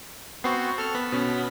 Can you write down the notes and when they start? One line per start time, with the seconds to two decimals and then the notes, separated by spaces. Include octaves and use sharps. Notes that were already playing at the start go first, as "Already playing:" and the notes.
0.44 B3 C4 F#4 C#6 C7
0.78 A4 F6
0.95 B3 B6
1.12 B2 C#4